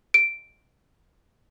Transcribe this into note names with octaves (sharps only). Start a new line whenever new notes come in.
D7